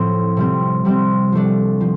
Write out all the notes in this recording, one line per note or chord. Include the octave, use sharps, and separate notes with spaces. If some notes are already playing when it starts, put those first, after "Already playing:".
Already playing: A2 F3 C4
C3 G3 C4
C3 G3 C4
F3 A3 D4
F3